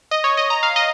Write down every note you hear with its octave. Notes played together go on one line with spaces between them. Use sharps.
D#5
C#5
D#5
A#5
F5
D#5